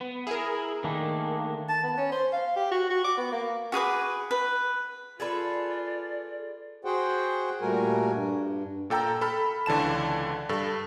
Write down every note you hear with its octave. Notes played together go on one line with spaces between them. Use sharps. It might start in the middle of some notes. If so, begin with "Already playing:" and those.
B3
E4 G#4 A#4
D#3 A3 A#3 D4
A5
B3
C#4
C5
F5
G4
F#4
F#4
D6
B3
A#3
F#4 G#4 B4 D6
B4
F4 G#4 A4 B4 D5
F#4 G#4 C5 F#5 G5
A#2 G3 A3 F#4 A#4 G#5
G2
A#2 A4 G5 A#5 E6
A4 B5 F6
C#2 D3 E3 A5 E7
G2 A4